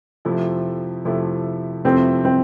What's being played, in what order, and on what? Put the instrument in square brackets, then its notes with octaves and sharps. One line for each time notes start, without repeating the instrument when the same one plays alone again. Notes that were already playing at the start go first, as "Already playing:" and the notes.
[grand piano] F2 C3 F3 A3 E4
F2 C3 F3 A3 E4
[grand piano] F2 C3 F3 A3 E4 [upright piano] C4
[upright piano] C4